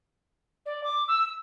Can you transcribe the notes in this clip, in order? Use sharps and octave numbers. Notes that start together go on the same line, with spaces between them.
D5
D6
E6